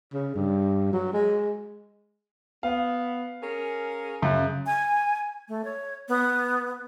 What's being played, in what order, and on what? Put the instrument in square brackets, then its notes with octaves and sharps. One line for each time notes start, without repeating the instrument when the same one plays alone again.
[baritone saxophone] C#3
G2
F#3
G#3
[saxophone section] B3 [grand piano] F5
[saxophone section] C#4 G#4 A#4
[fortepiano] F#2 [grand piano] C#3
[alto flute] G#5
A3
C#5
B3